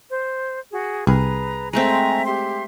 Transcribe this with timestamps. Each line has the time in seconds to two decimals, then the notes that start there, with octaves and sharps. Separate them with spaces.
0.09 C5
0.71 F#4 G#4
1.07 C2 G#4 B4 A#5
1.73 G#3 A3 C4 E5 G#5 A#5
2.26 G4 E5 C6